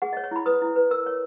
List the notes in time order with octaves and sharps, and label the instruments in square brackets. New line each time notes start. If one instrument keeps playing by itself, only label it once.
[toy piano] G#4 F#5
C#5 D#5
C#5
E4 B5
B4 D#6
E4
B4
A#4 E6
C#5